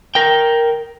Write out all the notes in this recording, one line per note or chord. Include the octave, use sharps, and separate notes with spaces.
A#4 G5